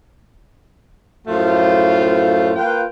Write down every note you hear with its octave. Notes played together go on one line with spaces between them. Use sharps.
F#2 A2 F3 A3 F4
A#3 F4 B4 G5